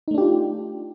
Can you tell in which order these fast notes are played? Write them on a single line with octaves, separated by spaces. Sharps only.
D#4 A3 D4 G4 F4